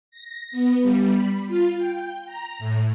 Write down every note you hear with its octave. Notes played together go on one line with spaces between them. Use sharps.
A#6
B3
G3
B5
F4
G5
A#5
A2